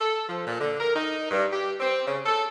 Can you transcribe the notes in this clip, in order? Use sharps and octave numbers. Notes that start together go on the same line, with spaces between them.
A4
F3
A#2
D3
A#4
D#4
G2
G4
C4
C#3
A4